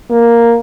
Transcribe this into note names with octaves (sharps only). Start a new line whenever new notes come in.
A#3